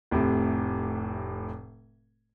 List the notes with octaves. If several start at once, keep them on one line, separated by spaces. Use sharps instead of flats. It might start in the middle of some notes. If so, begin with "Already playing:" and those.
F1 A2 C3